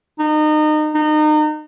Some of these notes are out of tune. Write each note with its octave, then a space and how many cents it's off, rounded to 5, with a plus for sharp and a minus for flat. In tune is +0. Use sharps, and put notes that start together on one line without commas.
D#4 -30
D#4 -30